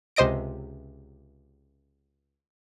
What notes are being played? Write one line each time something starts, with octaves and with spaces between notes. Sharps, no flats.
C#2 C3 C5 D#5 A#6 D7